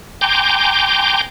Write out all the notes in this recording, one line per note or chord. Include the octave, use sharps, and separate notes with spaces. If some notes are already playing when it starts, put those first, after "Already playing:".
G5 G#5 A#5 C6 D6 G6